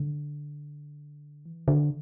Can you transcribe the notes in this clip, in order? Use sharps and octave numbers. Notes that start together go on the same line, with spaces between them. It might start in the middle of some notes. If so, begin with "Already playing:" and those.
Already playing: D3
E3
D3